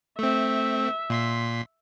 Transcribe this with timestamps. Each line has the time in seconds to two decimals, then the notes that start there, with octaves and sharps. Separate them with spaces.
0.19 A3 C4 E5
1.10 A#2 C6 B6